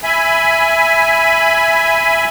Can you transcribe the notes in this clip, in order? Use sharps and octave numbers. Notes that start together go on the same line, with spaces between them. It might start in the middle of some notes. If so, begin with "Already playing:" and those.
E5 G#5 B5